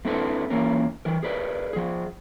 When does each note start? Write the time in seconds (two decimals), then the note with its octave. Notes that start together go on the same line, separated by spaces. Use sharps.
0.05 A3 C4 D4 E4 A4 B4
0.50 E3 A#3 C#4 A#4
1.05 E3 A#4
1.23 G#4 A#4 B4 D5
1.73 F3 G#4